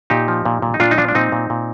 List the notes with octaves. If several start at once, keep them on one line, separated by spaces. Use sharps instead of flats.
A#2 D#4 G4
F3
A#2
A#2
D#4
A#2 D4 F4
D#4
F3 D4 F4
D4
A#2 C4 D#4
A#2
A#2